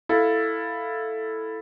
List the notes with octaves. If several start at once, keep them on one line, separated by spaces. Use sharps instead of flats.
E4 A4 F5